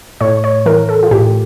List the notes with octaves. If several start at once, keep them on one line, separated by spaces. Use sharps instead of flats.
A2 C#5
C#5
E3 A#4
A4
F4
A2 G4